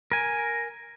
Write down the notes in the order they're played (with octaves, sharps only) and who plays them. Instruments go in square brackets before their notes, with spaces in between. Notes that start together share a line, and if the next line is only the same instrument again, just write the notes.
[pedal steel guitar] A#4 G#5